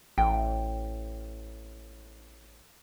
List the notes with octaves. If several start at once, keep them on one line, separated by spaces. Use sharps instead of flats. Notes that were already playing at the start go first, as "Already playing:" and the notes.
A1 G5